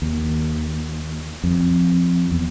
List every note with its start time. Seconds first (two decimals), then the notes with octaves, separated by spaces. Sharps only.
0.02 D#2
1.44 F2
2.31 E2